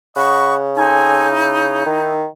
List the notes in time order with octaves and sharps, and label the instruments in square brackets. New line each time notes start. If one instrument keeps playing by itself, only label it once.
[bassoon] C#3 [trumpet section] D#5 F#5 B5 [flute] C#6
[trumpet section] C4 A4 G#5 [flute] D#4
[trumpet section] E4
[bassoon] D#3